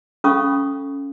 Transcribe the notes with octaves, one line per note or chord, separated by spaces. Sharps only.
C#4 A4 F5 B5 C#6 D#6